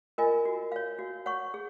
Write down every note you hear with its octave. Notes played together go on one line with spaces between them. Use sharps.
F4 A#4 D#5 G#5
F#4
C#5 F5
F#4
C#5 F#5 C#6
G#4